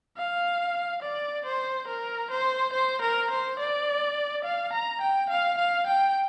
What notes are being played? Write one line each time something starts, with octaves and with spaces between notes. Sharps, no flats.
F5
D5
C5
A#4
C5
C5
A#4
C5
D5
F5
A#5
G5
F5
F5
G5